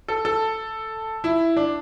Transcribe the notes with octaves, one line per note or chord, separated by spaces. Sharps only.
A4
A4
E4
D4